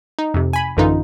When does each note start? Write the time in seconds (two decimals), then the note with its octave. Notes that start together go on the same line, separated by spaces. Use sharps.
0.19 D#4
0.34 F2 C3
0.53 G#5 B5
0.77 A1 F#2 D3 E3 D#4 F4